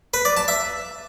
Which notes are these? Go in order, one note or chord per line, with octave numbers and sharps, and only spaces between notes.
B4
D5
A5
E5